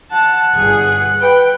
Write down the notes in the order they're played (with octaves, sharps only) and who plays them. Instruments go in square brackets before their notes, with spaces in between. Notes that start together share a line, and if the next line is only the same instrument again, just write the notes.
[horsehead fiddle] F#5 [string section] A5
[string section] G1 G#4
[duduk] B4 [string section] G5